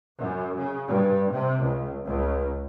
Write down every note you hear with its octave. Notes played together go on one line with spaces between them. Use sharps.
F#2
C#3
G2
C3
C#2
C#2